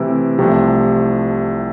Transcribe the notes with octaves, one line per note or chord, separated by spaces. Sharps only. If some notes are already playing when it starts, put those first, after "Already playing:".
Already playing: C3 E3 A3 E4
C2 C3 F3 A3